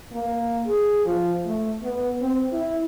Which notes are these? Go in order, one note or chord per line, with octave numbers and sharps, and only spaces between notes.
A#3
G#4
F3
A3
B3
C4
E4